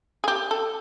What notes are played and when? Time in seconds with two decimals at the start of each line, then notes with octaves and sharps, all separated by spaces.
0.24 G#4
0.28 G4
0.51 A4